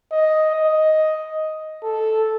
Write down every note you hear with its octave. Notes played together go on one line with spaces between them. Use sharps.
D#5
D#5
A4